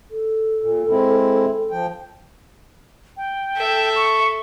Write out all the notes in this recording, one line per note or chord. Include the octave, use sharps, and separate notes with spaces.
A4
A#2
G#3 C4 E4
F3 G5
G5
A4 E5
C#6